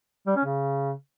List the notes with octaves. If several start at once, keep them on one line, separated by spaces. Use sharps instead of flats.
G3
C#4
C#3